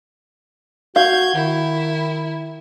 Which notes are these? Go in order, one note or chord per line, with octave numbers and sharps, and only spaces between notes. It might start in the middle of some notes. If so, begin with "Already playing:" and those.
F#4 F5 G6 G#6
D#3 E4